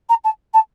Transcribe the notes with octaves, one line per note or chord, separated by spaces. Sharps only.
A#5
A5
A5